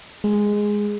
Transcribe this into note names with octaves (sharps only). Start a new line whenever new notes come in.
G#3